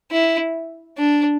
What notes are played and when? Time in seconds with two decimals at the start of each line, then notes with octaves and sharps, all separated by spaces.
0.11 E4
0.98 D4